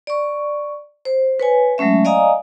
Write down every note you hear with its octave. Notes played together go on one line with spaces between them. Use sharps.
D5 C#6
C5
B4 C#5 G#5
F#3 G#3 A3 C#4 E5
D5 D#5 F5 G#5 A#5 D#6